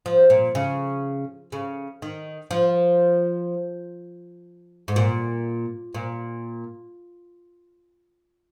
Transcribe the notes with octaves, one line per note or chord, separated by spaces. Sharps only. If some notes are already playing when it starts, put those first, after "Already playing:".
F3
A#2
C#3
C#3
D#3
F3
G#2
A#2
A#2